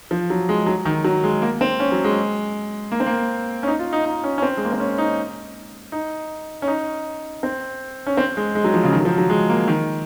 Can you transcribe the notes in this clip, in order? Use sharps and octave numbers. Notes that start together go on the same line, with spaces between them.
F3
F#3
G#3
F#3
D#3
F#3
G#3
A#3
C4
C#4
F#3
G#3
A#3
C4
A#3
C#4
D#4
F4
D#4
D#4
C#4
C#4
C4
G#3
A#3
C4
C#4
D#4
D#4
C#4
D#4
C4
C#4
C4
G#3
G#3
F#3
F3
C#3
D#3
F#3
F3
F#3
G#3
A#3
D#3